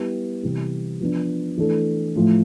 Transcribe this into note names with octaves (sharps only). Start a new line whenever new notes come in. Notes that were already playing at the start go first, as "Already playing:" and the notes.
Already playing: G3 B3 E4 G4
C3 E3 G3
F3 B3 D4
E3 A3 D4 A4
A2 F3 A3